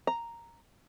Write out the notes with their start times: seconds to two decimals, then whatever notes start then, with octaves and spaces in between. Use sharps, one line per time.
0.07 A#5